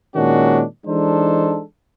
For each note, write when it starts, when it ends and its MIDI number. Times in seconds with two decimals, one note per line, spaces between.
0.14 0.63 46
0.14 0.63 51
0.14 0.63 56
0.14 0.63 61
0.14 0.63 62
0.14 0.63 66
0.86 1.61 52
0.86 1.61 56
0.86 1.61 62
0.86 1.61 63
0.86 1.61 69
0.86 1.61 72